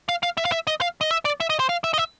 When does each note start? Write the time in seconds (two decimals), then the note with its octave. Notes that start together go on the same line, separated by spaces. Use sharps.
0.09 F5
0.23 F5
0.37 E5
0.45 F5
0.52 E5
0.67 D#5
0.81 F5
1.01 D#5
1.11 E5
1.25 D5
1.40 E5
1.50 D#5
1.59 C5
1.69 F5
1.84 E5
1.94 D#5
1.98 E5